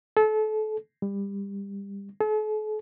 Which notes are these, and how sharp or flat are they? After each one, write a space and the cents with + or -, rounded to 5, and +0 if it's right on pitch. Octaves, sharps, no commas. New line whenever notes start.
A4 -30
G3 +25
A4 -45